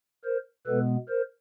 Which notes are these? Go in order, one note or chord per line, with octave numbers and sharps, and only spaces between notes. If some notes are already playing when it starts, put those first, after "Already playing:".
A#4 C5
B2 G#3 B3 A4 B4
A#4 C5